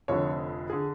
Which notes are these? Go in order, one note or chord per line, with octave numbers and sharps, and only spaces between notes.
F1 F2 D3 C#5
D3 G#4